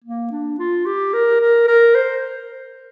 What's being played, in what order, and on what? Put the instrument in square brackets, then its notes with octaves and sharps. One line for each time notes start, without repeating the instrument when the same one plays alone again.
[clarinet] A#3
D4
F4
G4
A#4
A#4
A#4
C5